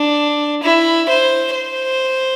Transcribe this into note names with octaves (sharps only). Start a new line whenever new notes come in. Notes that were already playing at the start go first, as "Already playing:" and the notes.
Already playing: D4
E4
C5
C5